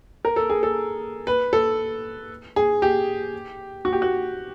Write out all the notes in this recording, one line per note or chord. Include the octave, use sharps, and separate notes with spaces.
A#4
A4
G#4
A4
B4
A4
G#4
G4
F#4
G4
F#4